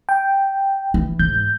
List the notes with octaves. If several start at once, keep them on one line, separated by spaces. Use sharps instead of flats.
G5
E3
G#2 G6